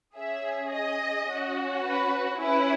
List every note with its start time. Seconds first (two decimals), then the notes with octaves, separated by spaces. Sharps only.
0.17 C#4 G#4 E5
0.72 D#5
1.27 C#4 F#4
1.84 B4
2.38 C#4 E4 G#4 B4